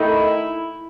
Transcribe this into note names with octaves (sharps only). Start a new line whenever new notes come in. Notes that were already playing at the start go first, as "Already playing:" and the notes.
Already playing: D#3 A3 D#4 E4